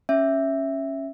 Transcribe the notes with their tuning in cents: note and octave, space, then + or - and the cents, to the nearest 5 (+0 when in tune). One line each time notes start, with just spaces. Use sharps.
C#4 -10 E5 +0